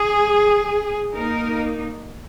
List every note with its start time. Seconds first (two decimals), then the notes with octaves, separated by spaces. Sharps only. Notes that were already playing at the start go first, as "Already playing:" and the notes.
Already playing: G#4
1.14 A#3 D#4 A#4